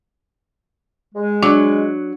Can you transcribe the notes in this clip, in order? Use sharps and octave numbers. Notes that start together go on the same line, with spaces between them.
G#3
F#3 D4 D5